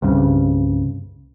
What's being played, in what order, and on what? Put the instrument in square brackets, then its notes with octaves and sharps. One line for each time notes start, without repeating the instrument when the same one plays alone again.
[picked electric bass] C2 G2 C#3